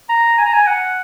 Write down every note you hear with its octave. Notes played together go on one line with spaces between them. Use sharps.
A#5
G#5
A#5
G#5
F#5